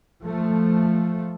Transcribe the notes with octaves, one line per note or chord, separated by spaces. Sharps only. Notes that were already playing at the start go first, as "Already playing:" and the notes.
F3 A3